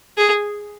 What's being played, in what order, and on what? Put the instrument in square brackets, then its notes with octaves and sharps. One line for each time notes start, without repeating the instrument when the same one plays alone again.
[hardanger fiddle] G#4